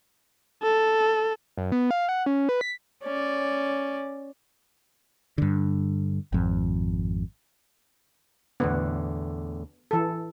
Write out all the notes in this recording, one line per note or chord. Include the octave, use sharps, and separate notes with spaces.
A4
F#2
B3
F5
F#5
C#4
B4
B6
C#4 D5
G2 D3
G#1 F2
E2 A2 D3 B3
E3 A4